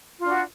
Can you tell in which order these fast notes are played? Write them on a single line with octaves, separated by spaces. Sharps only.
F4 D4 F#4